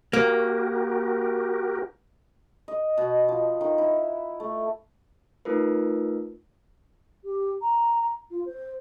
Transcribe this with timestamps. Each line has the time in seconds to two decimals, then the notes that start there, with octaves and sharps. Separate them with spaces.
0.13 A#3 F#4 G4 A#4
2.68 D#5
2.98 B2
3.29 F3
3.61 D#3
3.78 E4
4.40 A3
5.45 A3 D#4 F4 A#4 B4
7.23 G4
7.62 A#5
8.31 F4
8.46 C5